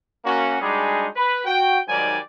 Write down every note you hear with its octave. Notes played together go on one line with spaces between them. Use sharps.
A#3 C#4 F#4
G3 G#3 D4 D#4 F#4 G#4
B4
F#4 G5
G#2 D#3 F#3 G3 D5 G#5